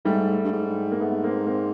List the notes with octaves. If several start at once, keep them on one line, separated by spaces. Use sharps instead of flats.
G#2 G3 A3
G2
G#2
A#3
A3 B3
A#3 C4
A#3 C4